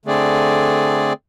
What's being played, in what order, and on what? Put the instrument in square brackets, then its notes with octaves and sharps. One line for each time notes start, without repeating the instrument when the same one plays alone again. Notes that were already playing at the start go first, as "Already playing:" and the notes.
[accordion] D3 A3 C4 G#4 D5